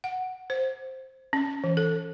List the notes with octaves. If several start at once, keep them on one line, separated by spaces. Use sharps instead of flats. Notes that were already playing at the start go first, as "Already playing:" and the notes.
F#5
C5
C#4
E3
A4